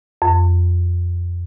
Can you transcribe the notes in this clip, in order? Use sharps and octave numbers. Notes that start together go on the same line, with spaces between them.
F2